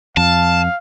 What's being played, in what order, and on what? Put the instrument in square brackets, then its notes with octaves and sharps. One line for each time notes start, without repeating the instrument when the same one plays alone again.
[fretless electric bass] F2 [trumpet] F5 [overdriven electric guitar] A5